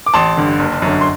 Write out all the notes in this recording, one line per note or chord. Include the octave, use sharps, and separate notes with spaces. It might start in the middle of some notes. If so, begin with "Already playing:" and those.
D6
A1 A5 C6
G2 D3
F#1
F#2 D3
C6